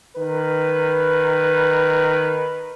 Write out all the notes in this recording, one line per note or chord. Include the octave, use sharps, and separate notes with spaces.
D#3 B4